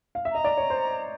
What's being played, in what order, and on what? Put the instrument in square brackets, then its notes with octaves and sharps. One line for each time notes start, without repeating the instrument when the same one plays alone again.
[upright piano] F5
E5
[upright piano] D#5 [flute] A#5
[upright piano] D5
C#5
C5